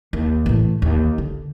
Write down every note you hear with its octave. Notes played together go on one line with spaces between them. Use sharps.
D#2
A2 E3
D#2
D3